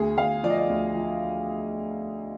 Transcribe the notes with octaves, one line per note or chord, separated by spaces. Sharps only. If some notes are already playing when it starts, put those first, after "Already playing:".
Already playing: D2 G#4
D2 F5
F3 D5
D#5
D5
D2
F3